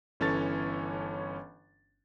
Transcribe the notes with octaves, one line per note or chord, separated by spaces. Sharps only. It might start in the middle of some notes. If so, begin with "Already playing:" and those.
G1 E3 C#4 A4 C#5 A6